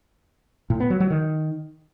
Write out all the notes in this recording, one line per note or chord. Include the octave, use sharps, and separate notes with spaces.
A2
B3
F#3
F#3
D#3